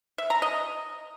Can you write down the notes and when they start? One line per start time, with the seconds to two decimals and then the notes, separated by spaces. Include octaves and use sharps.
0.18 E5
0.30 A#5
0.42 D#5